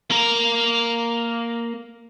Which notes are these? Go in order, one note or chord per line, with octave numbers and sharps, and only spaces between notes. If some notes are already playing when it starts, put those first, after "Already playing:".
A#3 A#4